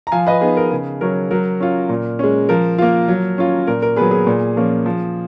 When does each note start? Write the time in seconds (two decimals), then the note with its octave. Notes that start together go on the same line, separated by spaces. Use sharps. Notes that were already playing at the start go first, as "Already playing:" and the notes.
0.07 A#5
0.12 F3 F5 G#5
0.27 B4 D#5
0.41 B3 D#4 G#4 B4
0.57 A#4
0.71 C#3 G#4
1.01 F#3 C#4 A#4
1.31 F#3 A#4
1.60 C#4 F4
1.89 A#2
2.19 G#3 C#4
2.49 F3 A#4
2.78 A#3 F4
3.08 F#3
3.38 C#4 F4
3.67 A#2 A#4
3.82 A#4
3.96 F#3 B3 G#4 B4
4.11 G#4
4.27 A#2
4.57 F3 A#3 C#4
4.86 F3